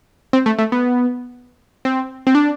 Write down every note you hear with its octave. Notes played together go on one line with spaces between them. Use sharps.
C4
A3
A3
B3
C4
C4
D4